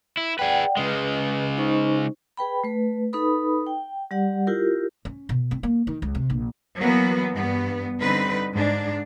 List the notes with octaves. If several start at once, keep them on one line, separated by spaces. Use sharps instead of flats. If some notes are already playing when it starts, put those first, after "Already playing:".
E4
G#4 B4 D5 F#5 G5
C#3 G#3 B4
D#4 C5 C#6
G#4 B4 G5 B5
A3 B4
D#4 A4 B4 B5 D#6
G5
G3 G4 D5 F#5
E4 F4 G4 A#4
C#4
B2
C4
A#3
D#3
C#2
C3
A#1
E3 F#3 A#3 B3
G2 B3
D3 G3 C4 D#4 B4
G#2 D4